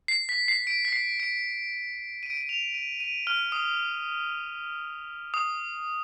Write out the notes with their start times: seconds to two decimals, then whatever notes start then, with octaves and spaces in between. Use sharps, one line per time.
0.08 C7
0.29 B6
0.48 C7
0.67 D7
0.85 B6
0.93 C7
1.20 D7
2.23 D#7
2.30 D7
2.37 D#7
2.49 F7
2.74 D#7
3.00 D#7
3.27 F6
3.52 D#6
5.34 D#6